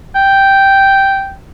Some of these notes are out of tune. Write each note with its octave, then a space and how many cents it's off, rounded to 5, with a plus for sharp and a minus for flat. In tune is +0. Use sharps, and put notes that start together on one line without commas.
G5 -5